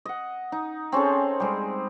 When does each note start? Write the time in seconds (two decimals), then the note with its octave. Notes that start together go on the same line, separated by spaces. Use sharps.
0.05 D#5 F#5
0.52 D#4
0.92 C4 C#4 G#4 A4
1.40 G3 G#3 C5